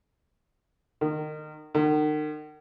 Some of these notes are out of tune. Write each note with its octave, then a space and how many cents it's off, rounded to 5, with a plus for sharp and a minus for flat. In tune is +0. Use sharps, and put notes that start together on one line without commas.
D#3 -25
D#3 -40